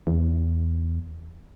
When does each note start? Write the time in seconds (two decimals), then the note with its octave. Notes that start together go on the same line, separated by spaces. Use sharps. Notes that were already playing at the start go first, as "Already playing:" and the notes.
0.07 E2